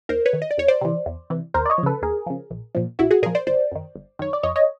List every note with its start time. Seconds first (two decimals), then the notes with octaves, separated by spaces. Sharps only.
0.09 D#2 A#4 C5
0.26 B4 C#5
0.33 D#3
0.42 D#5
0.51 D5
0.58 E2 C#5
0.68 C5 D5
0.81 C3 E3
1.06 E2
1.30 C3 E3
1.54 D#2 A#4 C5
1.66 D5
1.70 C#5 D#5
1.78 F3
1.83 C#3 A4 B4
2.02 D#2 G#4 A#4
2.26 C#3 F3
2.50 A#1
2.75 A#2 F3
2.99 A#1 E4 F#4
3.11 F#4 G#4
3.22 A#2 F3 G#4 A#4
3.35 C5 D5
3.47 G1 C5 D5
3.72 F#2 D#3
3.95 G1
4.19 F#2 D#3 C#5
4.33 D5
4.43 F2 C#5 D#5
4.56 C#5 D#5